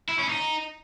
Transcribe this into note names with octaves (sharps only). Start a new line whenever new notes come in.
E4
C#4
D#4